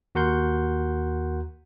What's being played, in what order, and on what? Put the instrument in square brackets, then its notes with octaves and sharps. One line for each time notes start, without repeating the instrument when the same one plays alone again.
[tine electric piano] D#2 F#4 A#4 F#5 C6 G6